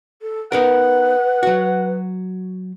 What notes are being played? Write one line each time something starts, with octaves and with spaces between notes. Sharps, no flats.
A4
B3 D#4 A#4 B4 F#5
F#3 F#4